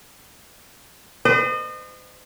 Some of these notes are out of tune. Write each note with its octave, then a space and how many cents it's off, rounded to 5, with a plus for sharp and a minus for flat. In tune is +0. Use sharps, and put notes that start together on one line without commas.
C5 -45 D#5 -35